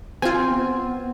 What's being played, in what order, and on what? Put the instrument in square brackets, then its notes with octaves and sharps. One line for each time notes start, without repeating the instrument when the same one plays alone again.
[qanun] C4 [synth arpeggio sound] F4 G#5
[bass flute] B3